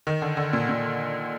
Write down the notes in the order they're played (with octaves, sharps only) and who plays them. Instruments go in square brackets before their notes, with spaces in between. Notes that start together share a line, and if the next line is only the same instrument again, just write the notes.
[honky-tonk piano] D#3
D3
D3
A#2
A#2